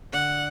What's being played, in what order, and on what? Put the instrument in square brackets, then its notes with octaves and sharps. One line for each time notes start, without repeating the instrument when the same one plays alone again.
[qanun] D3 D4 [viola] F#5